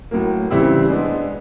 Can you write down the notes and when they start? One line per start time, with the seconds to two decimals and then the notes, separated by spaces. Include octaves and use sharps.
0.11 A2 F#3 A#3
0.51 C#3 E3 G3 C4 E4
0.90 G#3 B3 D4